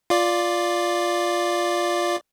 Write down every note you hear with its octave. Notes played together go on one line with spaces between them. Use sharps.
F4 D5